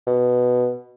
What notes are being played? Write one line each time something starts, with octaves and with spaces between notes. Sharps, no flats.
B2